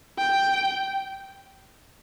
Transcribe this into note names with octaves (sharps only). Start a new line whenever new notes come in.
G5